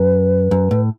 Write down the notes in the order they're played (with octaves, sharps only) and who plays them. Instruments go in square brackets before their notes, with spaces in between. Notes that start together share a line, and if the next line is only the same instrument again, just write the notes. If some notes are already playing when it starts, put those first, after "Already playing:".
Already playing: [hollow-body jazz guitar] F#2 [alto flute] B4
[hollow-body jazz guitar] F#2
A2